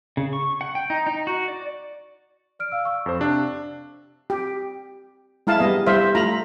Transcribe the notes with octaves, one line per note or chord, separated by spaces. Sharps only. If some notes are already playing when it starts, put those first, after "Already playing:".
C#3
C#6
F#5
G5
D#4
D#4
F#4
D5
D5 F6 D7
F5 E6
F5 C#6 E6
F2 C5
C3 D4
G4
G#3 E4 F5 A5
G3 B3 D#5
G3 E4 C5 E5 F5
A3 F4 A#5 B5